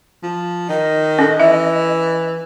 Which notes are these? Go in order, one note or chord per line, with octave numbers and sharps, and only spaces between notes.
F3
D#3 D#5
C#4 A4
E3 E5